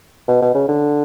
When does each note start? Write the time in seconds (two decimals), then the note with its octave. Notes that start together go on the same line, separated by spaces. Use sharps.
0.28 B2
0.42 B2
0.55 C#3
0.69 D3